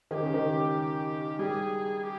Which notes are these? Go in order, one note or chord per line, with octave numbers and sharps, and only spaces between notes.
D#3 G4 G#4
C#3
D#3
G3 G#4
G4